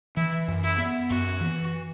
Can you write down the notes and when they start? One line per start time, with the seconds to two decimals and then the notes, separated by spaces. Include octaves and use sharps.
0.16 E3 E4
0.48 F#2
0.63 E4
0.78 B3
1.09 F#2 F#4
1.40 E3